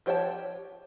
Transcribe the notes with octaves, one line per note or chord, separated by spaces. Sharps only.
F3 G4 C#5 G5 A5